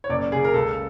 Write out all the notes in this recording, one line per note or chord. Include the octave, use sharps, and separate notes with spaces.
C#5
F#1 D5
C#3 G#4
A#4
C#2 A4